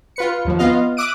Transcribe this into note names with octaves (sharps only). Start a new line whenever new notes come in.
F4 B4 C#7
D#2 F3
B3 F4 D#5 F5
E5 D6 D#6 F#6 D7 D#7